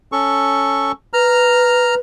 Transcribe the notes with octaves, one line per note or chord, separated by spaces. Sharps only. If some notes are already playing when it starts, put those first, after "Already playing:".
C#4 A4 C#6
B4 A#5 F6